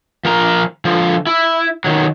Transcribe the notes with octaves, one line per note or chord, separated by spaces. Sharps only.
F3 A#4 A#5
D3 F3
E4
D#3 F#3